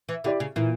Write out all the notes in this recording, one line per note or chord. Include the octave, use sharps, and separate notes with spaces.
E3
D3 E4 G4 D5
C#3
A#2 E3